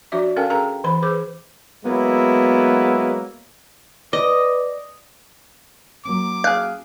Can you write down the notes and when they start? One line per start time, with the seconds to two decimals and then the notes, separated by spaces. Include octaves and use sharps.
0.12 F3 D4 F#4 D5 E5
0.36 C#4 A4 A#4 F5 G5 G#5
0.50 G#4 A#4 F5 G5 A#5
0.84 E3 C5 B5
1.02 G#4 B4 C5 D6
1.84 F#3 G#3 A#3 B3 E4
4.13 B4 D5 D#5
6.05 F#3 A#3 C#4 D6
6.44 G#4 F5 F#6